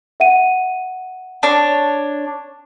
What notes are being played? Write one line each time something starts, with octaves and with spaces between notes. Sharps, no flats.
E5 F#5 D#7
D4 C#5